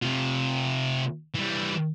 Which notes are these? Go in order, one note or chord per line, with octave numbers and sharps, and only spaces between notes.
C3 F4
E3 G3